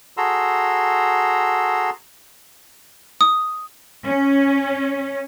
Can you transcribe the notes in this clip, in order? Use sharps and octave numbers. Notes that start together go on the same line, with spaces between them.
F#4 G#4 A4 A#5 C6 E6
D#6
C#4